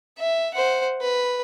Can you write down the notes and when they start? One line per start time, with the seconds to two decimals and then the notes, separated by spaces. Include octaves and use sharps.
0.18 E5
0.54 C5 F#5
1.01 B4